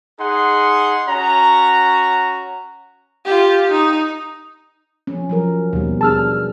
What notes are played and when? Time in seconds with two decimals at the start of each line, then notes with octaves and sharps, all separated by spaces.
0.19 D#4 G#4 F#5 C6
1.08 C#4 F#4 A#5
3.25 F4 G4
3.71 D#4
5.07 F3 C#4
5.29 F3 F#3 A#4
5.73 D#2 B2 G3
6.01 D4 G#4 A5 E6 F6